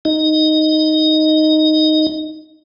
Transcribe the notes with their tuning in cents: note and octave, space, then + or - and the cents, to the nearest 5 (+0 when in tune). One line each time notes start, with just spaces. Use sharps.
D#4 +0 D#5 +0